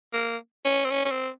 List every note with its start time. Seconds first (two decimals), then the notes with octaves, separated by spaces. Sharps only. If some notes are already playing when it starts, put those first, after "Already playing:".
0.13 A#3
0.65 C#4
0.85 C4
0.91 C#4
1.05 C#4
1.11 C4